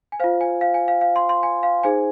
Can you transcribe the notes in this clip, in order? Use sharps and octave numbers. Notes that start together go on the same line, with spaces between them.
G#5
F4 C5 F5
G#5
F5
G#5
F5
F5
C6
C6
G#5
F5
D#4 G#4 C5 G#5